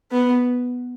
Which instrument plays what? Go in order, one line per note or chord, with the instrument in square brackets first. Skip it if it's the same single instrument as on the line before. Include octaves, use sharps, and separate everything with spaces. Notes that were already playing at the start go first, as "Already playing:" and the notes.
[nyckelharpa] B3